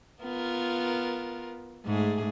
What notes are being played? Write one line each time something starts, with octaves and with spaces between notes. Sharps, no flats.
B3 F4 A#4
G#2 A3 G#4